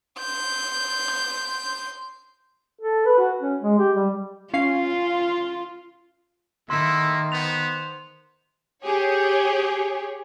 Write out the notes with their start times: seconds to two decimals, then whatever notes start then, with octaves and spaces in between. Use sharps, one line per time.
0.19 C6 G6
2.81 A4
3.06 B4
3.19 F#4
3.41 C#4
3.62 G#3
3.79 G4
3.95 G3
4.54 C#4 F4 F5 C7
6.70 D#3 A3 A#3 E4 E5 C6
7.32 B3 C5 F7
8.83 G4 G#4 C#5